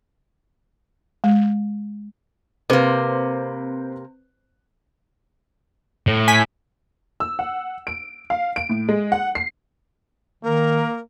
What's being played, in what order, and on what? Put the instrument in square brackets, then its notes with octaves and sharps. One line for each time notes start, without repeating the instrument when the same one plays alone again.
[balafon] G#3
[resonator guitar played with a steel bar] C3 A#3 [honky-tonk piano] C4 B4 C5
[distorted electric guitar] A2
[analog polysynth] G#5 B6
[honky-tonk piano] E6
F#5
D7
F5
D7
A2
G#3
F#5
C7
[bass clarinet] D#3 [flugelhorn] A#3 [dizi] A#4